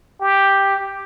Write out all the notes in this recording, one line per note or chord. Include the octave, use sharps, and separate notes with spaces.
G4